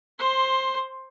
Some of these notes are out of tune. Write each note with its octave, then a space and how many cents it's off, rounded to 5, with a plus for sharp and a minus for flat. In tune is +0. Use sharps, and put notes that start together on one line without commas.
C5 +15 C6 +0